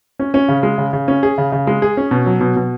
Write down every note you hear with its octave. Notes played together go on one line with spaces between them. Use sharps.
C#4
C#4
C#3
G#3
C#3
C#3
C#4
G#4
C#3
C#3
G#3
G#4
C#4
B2
F#3
B2
B2